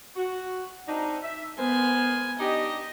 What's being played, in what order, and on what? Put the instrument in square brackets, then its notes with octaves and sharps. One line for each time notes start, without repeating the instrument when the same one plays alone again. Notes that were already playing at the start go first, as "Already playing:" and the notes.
[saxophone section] F#4
C4 D4 D#4
E5
[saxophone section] G#3 A#4 C5 [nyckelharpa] B3 G#5
[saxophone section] D4 D#4 G4 [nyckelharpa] D#5